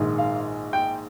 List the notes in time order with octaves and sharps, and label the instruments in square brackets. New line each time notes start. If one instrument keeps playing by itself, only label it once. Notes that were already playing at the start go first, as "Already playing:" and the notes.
Already playing: [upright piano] A#1 G#2 D#3 G#3
F5
G5